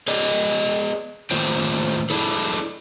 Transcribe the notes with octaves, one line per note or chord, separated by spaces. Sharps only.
B3 G#4 D5 D#5
A2 D#3 A#3 F4 C5 G5
D4 E4 G#4 A4